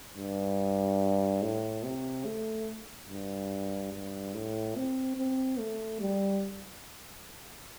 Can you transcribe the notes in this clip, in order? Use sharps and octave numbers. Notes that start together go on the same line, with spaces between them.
G2
A2
C3
A3
G2
G2
A2
C4
C4
A3
G3